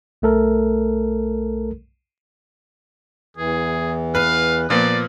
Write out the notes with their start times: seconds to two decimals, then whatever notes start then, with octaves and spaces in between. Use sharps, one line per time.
0.22 B1 A3 A4 A#4
3.37 E2 E3 G#4
4.15 B4 F5
4.70 A#2 F3 B3 D5